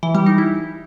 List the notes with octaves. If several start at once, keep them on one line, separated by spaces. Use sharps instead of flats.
E3
G3
D#4
E4